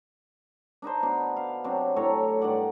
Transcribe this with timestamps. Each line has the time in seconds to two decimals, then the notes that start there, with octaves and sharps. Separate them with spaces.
0.82 D4 D#4 B4 C5
1.03 B2 D4
1.37 F5
1.64 C3 F#3 C4 D4
1.96 A2 A4 C#5 A#5
2.41 G2 D#3 D5 F#5